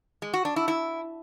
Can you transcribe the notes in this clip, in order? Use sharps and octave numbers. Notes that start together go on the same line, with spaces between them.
G#3
F#4
D4
E4
E4